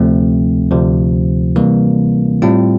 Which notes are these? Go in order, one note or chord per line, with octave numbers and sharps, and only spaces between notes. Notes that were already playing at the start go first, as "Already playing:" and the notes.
Already playing: D2 C3 F3 A3 C4
D2 C3 F3
C3 E3 G3 A#3
A2 G3 C4 F4